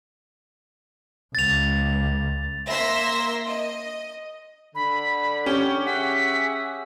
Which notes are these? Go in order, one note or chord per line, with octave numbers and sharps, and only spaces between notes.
C#2 A6 F7
A#3 E5 C6 E6 A#6
D#5
D3 B5
C#4 G4 G7
G#4 E5 F#5 B6